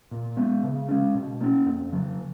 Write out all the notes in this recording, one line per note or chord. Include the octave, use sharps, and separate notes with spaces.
A#2
G#3 B3
C#3
G#3 C#4
B2
A#3 C#4
F2
C#3 F#3